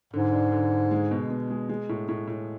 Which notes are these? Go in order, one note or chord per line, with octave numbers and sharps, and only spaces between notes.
G#2 D3
D4
D3
D3
G#3
B2
B2
G#3
G#3
A2
A2
A2